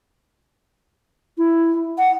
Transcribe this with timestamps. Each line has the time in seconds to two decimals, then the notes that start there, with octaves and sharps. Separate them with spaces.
1.38 E4
1.98 F#5